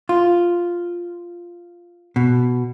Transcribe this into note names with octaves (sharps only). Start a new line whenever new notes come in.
F4
B2